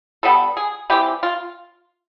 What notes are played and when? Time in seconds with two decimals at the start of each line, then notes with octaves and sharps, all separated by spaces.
0.23 D3 G3 B3 A4
0.57 G#4
0.90 E3 G3 C4 G4
1.23 F4